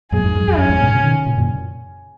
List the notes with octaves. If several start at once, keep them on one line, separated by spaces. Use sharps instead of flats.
F#2 A#2 G#4
F2 G#2
F#2
F2
F#2 C#4
F2 G#2
G#2 B2
A#2 C#3
B2 D#3
A#2 C#3
F#2 A#2